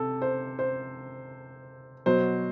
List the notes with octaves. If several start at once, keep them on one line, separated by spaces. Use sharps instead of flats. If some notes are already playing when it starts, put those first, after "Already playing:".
Already playing: C3 A4
C5
C5
B2 F#3 C5